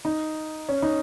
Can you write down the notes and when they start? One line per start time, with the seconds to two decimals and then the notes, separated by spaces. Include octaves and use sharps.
0.05 D#4
0.69 C#4
0.82 D#4